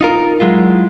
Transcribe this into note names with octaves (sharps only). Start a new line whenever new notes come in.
D#4 F4 A#4
F#3 G#3 E4 F4